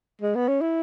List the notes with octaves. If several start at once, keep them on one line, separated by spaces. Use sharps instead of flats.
G#3
B3
C#4
E4